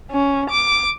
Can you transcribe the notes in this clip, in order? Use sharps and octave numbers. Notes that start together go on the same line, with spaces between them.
C#4
D6